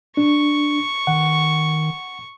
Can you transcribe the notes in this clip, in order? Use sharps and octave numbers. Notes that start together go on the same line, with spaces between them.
D4 C#6
D#3 F#5